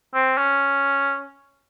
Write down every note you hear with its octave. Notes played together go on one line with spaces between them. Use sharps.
C4
C#4